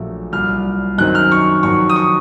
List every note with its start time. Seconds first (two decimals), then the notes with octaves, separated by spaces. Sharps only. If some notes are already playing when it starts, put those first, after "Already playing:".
Already playing: A#1 A#2 F#3 A3
0.32 C2 A#2 F#3 F6
0.98 F#2 D#3 F#3 C4 D#4 F#6
1.15 F6
1.32 C#6
1.63 F2 D#3 F#3 C#6
1.90 D#6
1.96 C#6